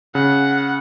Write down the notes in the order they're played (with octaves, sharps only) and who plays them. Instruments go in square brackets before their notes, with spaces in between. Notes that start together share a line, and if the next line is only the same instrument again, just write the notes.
[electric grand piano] C#3 [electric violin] F#5